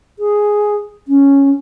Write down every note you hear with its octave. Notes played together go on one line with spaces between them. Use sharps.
G#4
C#4